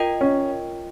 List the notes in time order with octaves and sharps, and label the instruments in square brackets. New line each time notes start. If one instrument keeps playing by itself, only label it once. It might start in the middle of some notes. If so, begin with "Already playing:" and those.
Already playing: [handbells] F4 A#4 D#5 G5
[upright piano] C#4